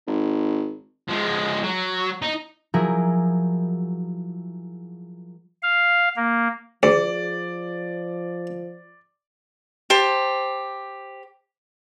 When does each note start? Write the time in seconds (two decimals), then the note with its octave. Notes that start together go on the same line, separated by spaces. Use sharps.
0.08 G#1
1.08 F3 G#3
1.64 F#3
2.22 D#4
2.74 F3 F#3 E4 G#4 A#4
5.62 F5
6.16 A#3
6.83 D2 F3 G#4 D5
9.90 G4 C5 A5